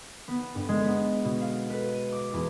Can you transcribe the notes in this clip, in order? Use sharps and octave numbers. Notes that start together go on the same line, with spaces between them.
B3
G2
G#3
B3
B2
F5
B4
D#7
D6
E2